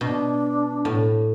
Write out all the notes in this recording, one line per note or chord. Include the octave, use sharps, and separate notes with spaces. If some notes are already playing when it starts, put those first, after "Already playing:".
B2 D4
A2